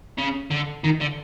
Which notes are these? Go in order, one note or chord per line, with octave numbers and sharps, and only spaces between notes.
C#3
D3
D#3
D3